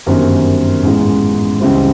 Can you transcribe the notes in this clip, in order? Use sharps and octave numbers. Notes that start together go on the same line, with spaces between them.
G1 F#2 D#3 G3 C4
A1 G#2 E3 G#3
C#2 C#3 E3 G3 C4